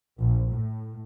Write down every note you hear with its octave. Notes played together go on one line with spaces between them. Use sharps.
A#1
A2